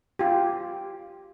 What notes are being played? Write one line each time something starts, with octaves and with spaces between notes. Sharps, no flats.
F4 G4